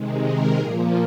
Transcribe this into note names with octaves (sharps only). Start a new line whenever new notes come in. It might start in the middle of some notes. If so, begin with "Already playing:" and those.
Already playing: C3 D#3 G#3
A#4
A#2 F3 A#3 G#4